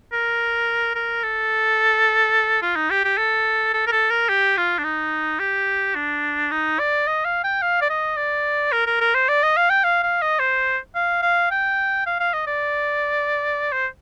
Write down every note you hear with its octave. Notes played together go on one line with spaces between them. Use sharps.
A#4
A#4
A4
F4
D#4
G4
G4
A4
A4
A#4
A4
A#4
G4
F4
D4
D#4
G4
D4
D#4
D5
D#5
F5
G5
F5
D5
D#5
D5
A#4
A#4
A#4
C5
D5
D#5
F5
G5
F5
F5
D#5
C5
F5
F5
G5
F5
F5
D#5
D5
C5